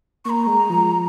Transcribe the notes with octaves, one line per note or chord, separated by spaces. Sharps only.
A#3 A#5 C#6
G#3
F3